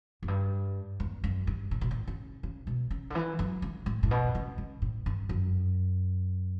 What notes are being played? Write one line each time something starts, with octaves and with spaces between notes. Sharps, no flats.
F#2
G2
E2
F#2
G2
A2
B2
A2
C#3
C#3
B2
C#3
D3
E3
F#3
D3
A2
A2
B2
C#3
C#3
A2
G2
F#2